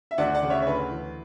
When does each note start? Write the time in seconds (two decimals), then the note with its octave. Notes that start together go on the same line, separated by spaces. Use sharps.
0.11 E5
0.18 D2 D5 F#5
0.35 D5 F#5
0.42 C#3
0.50 C#5 E5
0.62 C#5
0.67 D2 B4
0.91 E3